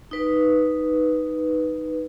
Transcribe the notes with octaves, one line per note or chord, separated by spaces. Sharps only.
D#4 B4